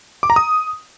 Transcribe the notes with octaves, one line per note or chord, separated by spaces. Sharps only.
D6
A#5
D#6